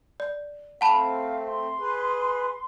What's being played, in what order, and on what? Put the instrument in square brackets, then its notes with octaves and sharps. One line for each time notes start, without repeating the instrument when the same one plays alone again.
[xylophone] D5
[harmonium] A3 C4 [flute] F5 [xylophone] F#5 A5 B5
[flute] C6
[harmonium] G#4 B4